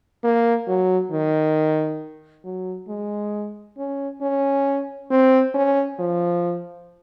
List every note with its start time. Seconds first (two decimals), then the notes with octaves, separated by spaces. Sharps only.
0.24 A#3
0.67 F#3
1.12 D#3
2.44 F#3
2.88 G#3
3.78 C#4
4.21 C#4
5.11 C4
5.54 C#4
5.99 F3